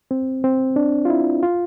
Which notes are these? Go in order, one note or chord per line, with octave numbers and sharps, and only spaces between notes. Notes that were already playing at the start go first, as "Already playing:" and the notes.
C4
C4
D4
F4
E4
F4